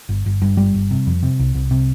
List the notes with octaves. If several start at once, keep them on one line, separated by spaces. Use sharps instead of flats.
G1
G1
G2
G1 G3
G1
C3
F2
C3
C2
C2
C3